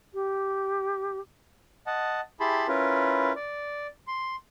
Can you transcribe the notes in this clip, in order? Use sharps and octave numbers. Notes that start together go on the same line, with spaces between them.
G4
D#5 F#5 A5
E4 G4 G#4 A5 B5 C6
C#4 E4 F4 A#4 B4
D5
C6